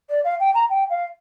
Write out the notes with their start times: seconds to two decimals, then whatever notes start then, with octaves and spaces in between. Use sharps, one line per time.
0.10 D5
0.24 F5
0.40 G5
0.54 A#5
0.70 G5
0.90 F5